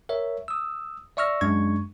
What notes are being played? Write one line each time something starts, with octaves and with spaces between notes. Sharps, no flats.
A#4 C#5 E5
D#6 E6
D5 E5 C#6 E6 F6 A#6
F#2 G#3 D4 C#6 G#6